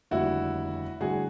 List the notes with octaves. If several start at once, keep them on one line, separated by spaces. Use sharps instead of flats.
F1 D#2 D3 G3 E4 F#4
A1 G2 D3 F#4 G#4